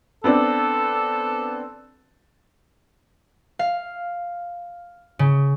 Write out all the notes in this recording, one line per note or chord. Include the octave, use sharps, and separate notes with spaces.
B3 C4 D4 A4
F5
C#3